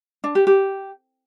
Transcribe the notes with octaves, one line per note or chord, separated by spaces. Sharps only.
D4
G4
G4